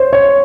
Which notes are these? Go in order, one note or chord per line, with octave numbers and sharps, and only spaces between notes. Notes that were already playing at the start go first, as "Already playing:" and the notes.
Already playing: C5 C#5
C#5